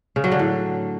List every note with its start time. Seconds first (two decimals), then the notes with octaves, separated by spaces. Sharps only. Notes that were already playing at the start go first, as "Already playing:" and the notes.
0.16 C#3
0.24 F#3
0.32 D3
0.39 A2